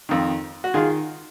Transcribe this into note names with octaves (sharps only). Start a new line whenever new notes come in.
F2 D#3
F#4
D#3 F4 G#4